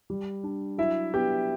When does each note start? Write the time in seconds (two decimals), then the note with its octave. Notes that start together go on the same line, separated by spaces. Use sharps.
0.10 G3
0.43 D4
0.78 F#3 E4 E5
1.13 B3 G4 G5